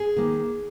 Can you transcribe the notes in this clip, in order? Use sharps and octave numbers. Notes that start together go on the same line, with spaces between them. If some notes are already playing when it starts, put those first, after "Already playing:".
Already playing: G#4
D#3 A#3